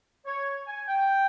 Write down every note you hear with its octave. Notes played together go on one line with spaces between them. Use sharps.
C#5
G#5
G5